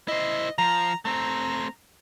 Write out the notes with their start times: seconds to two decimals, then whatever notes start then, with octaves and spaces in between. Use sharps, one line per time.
0.08 E4 C5 D#5
0.58 F3 A#5
1.05 A3 C4 A#5